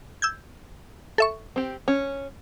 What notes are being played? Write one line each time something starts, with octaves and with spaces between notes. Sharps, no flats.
E6 G6 G#6
A4 E5 C#6
C4 G4
C#4